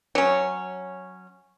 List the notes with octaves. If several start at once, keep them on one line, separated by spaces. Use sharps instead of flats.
F#3 C#4